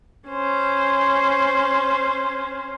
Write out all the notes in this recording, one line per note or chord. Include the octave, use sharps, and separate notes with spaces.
C#4 C5